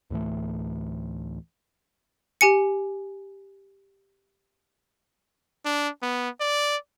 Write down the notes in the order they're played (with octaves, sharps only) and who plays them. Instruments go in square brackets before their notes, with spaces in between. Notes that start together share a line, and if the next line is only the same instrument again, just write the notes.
[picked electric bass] D2 A2 E3 A3
[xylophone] G4 G#5 C#7
[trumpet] D4
B3
D5